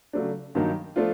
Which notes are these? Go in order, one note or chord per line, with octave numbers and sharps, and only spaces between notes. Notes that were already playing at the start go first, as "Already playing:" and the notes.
C#3 F#3 A3 D4
G2 D#3 F#3 A#3 D#4
F3 A3 D4 F4